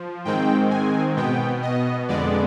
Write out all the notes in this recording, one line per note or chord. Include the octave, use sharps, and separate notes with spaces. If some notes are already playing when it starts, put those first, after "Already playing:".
Already playing: F3
G#2 D#3 G#3 C4 G5
G#5
B2 B3 G5
D#5
F2 D3 G#3 B3 D5